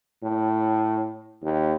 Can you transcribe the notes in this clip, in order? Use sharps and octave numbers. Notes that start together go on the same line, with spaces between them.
A2
D#2